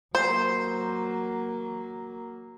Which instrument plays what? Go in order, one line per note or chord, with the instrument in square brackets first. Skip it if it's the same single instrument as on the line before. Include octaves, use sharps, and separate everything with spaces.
[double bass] F#3 A#3 [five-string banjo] C5